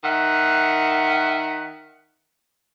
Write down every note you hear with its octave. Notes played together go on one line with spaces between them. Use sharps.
D#3 E5 F#5